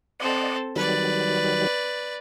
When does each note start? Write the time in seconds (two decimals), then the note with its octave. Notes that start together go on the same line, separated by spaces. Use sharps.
0.20 C4 A4 D5 D#5 F#5
0.76 D#3 F#3 G3 B4 D5